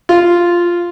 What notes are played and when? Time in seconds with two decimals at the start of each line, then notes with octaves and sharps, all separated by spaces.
0.09 F4